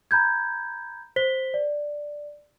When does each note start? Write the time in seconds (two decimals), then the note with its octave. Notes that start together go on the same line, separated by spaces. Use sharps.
0.11 A#5 B5 G6 G#6
1.16 C5 B6 G7
1.54 D5